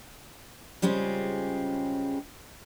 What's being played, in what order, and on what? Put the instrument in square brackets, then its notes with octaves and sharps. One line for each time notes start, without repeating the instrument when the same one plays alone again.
[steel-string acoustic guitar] C#3 G3 G#3 C4 C#4 F4